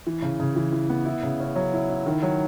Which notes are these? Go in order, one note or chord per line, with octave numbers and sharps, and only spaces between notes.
E3
C#3
C#3
E3
E3
B3
E4
C#3
C#4
F#3
E4
E4
D#3
F#3